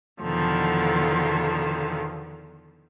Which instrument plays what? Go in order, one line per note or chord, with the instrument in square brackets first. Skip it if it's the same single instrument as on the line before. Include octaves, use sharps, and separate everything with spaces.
[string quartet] E2 B2 D3 D#3 F3